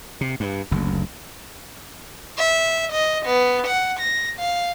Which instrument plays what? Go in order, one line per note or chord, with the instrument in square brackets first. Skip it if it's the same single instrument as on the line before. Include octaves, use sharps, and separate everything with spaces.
[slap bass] C3
G2
F#1 D2
[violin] E5
D#5
B3
F#5
A#6
F5